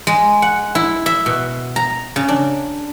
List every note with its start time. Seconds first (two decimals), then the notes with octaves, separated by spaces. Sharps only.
0.07 G#3
0.42 F#5
0.75 E4
1.06 E5
1.26 B2
1.76 A#5
2.16 C#3
2.28 D4